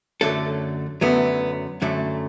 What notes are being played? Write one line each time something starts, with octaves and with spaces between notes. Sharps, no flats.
F#2 D3 F#3 A3 A4
F#2 D3 F#3 A3 B3
F#2 D3 F#3 A3